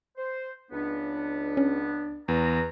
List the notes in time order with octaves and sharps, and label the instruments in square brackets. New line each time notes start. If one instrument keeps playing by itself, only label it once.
[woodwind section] C5
[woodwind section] C#2 B3 [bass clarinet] D4
[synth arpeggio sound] C#4
[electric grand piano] E2 [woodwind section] B4 A#5